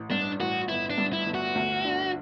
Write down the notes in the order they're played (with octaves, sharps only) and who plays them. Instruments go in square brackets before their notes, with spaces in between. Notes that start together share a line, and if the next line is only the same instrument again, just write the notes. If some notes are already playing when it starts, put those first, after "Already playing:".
Already playing: [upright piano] A1
[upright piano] G2 [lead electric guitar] D4
[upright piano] A1 [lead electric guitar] F#4
[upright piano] G1 [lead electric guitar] E4
[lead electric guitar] D4
[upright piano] G2
[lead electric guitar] E4
[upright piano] G1
[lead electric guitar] F#4
[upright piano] D2
D3